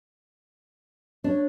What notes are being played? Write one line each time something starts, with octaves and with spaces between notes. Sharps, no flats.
D4 C#5